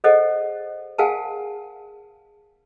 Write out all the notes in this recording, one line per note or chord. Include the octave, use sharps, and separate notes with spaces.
G#4 A4 C5 D#5 F#5
G#4 A#4 F5 F#5 G#5 A5